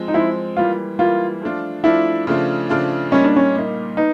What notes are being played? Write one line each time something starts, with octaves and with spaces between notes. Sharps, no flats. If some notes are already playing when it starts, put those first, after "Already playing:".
Already playing: F3 G#3 C4
D#4
F3 G#3 C4 E4
E3 G3 A#3 F4
E3 G3 A#3 F4
F3 A3 D4 F4
F3 A3 D4 E4 F4
C#3 F3 A3 D4 F4
C#3 F3 A3 D4 F4
A#2 G3 A#3 C#4 D#4
D4
C#4
A#2 G3 A#3 D#4
B3 D#4